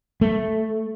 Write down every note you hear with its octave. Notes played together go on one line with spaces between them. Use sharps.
A3